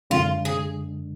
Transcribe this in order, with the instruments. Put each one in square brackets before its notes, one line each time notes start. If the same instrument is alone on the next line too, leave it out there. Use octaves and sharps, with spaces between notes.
[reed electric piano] F#2 D3 G#3 D4 [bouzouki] F4
[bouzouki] G#4